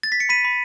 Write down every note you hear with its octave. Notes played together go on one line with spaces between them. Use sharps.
A6
B6
C#7
B5 B6 D#7
B5